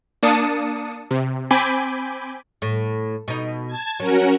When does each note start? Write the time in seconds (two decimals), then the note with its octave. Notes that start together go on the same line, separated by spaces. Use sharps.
0.23 A#3 D4 A5 D#6 C#7
1.11 C3
1.51 C4 G#5 B5 D6 G6 B6
2.62 A2
3.28 B2 D#4
3.67 A5 G#6
4.00 F#3 C#4 F#4 A#4